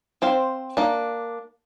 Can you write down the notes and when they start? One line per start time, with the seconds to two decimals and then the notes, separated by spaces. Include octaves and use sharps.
0.22 C4 C5 F5
0.77 A#3 D4